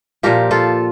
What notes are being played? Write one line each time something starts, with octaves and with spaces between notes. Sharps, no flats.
A#2 F3 G4 A#4
F4 A4